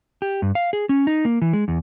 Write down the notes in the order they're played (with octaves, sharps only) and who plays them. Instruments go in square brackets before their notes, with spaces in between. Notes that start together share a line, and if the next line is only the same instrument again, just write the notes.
[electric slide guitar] G4
G2
F5
G#4
C#4
D#4
A#3
E3
G#3
E2